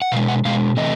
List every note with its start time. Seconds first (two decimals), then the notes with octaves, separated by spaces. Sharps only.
0.02 F#5
0.12 B2 F5
0.16 G#3
0.28 F#5
0.45 B2 G#3 F5
0.77 C3 E3 A3 D#5